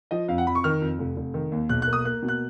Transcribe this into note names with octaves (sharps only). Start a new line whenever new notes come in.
F3 D#5
F2 F5
F#5
F2 B5
C#6
D#3 F6
F2
F1
F1
D#3
D#2
B1 F#6
F#6
A#3
D#6
A#3 F#6
B2
F#6